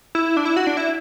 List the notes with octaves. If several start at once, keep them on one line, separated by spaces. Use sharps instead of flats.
E4
D4
E4
F#4
D4
E4